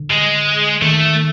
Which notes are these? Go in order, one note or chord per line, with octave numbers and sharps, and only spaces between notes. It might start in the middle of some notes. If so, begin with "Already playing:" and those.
Already playing: D3
G#3
D#3 A3